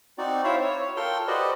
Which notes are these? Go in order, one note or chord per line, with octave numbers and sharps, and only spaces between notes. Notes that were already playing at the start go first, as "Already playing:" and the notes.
C4 D#4 F#4 D5
E4 C5 C#5 E5 F5
C#5
F4 A4 A#4 G5 C6
F#4 G4 B4 C5 D5 D#5